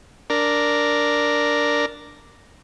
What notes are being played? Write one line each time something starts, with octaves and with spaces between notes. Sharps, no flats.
D4 A#4